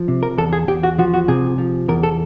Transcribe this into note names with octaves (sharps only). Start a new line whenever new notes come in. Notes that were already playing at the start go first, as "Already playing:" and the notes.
Already playing: F3
C3
A#4
E2 A4
G#4
E2 G4
F#4
F3 F#4
F#4
C3 G#4
F3
E2 A#4
A4